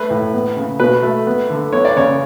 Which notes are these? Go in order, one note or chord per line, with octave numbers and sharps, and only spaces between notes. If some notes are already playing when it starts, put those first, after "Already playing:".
Already playing: A3 B4
A2
B3
C#3
B2 B4
A3
B3
D3
B3 C#5
D5
C#3 C#5